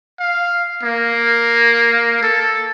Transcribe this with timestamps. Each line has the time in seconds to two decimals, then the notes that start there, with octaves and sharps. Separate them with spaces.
0.19 F5
0.83 A#3
2.23 A4